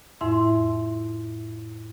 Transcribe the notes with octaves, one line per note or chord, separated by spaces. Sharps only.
F2 A2 E4 E5 C6